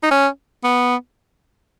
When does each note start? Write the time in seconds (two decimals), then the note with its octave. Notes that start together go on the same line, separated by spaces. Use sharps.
0.03 D#4
0.11 C#4
0.64 B3